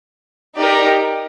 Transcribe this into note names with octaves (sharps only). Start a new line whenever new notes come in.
D#4 G4 A#4 D5